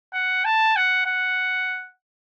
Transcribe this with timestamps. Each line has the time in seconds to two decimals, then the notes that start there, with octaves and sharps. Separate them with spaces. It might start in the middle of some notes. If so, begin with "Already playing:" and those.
0.13 F#5
0.45 A5
0.76 F#5
1.06 F#5